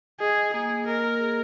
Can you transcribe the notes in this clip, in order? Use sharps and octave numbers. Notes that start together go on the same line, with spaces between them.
G#4 D#5
D#5
A#3 G#4
A#3
A#4 D#5
A#3
G#4